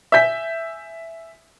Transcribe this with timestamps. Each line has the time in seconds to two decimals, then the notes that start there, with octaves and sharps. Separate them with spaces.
0.12 E5 G#5 G6 B6